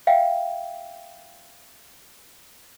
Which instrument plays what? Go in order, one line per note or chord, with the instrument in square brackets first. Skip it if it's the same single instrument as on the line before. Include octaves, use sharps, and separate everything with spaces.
[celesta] E5 F5 G5